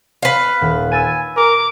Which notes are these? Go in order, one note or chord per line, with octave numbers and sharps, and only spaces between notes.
B4 F5
D#1
G#5 E6 A6 D#7
A#4 D6